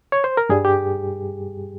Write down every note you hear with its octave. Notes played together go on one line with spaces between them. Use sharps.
C#5
C5
A#4
G2 G3 G#4
G4